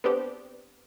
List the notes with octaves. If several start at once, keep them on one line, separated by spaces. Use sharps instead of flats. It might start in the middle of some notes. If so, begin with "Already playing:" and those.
B3 C4 D4 G4